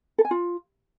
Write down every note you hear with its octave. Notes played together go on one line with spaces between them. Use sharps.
A4
G#5
F4